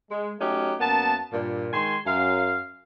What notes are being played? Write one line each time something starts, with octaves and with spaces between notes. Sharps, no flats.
G#3
F#3 A3 C#4 D#4 G4
F#2 A#3 B3 A5
G2 A#2
D#3 G#3 G#5 C6
F#2 F5